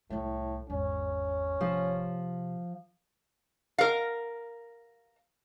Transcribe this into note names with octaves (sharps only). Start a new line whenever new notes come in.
C2 A2 A3
G#1 E2 C#4
C3 F3
A#4 F5